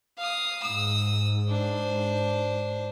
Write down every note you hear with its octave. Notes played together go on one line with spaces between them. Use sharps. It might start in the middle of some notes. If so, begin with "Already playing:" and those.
F5 D#6
G#2 D#6 E6
D4 C5